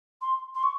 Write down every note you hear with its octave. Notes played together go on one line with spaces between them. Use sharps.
C6
C6
C#6